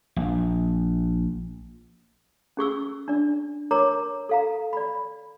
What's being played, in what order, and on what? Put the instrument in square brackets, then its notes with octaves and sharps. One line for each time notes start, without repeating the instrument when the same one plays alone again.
[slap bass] A#1
[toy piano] C#4 G#4 C#6 E6
D4 D5
A#4 C#5 A#5 D6
A4 F5 A#5
D5 B5